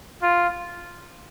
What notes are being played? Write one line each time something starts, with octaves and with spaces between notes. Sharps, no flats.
F4